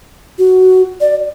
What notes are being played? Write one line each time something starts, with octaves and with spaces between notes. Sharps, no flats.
F#4
D5